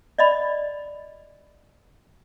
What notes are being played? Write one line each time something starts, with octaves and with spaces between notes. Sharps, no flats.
D5 D#5 B5